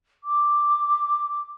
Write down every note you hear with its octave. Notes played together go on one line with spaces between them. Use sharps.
D6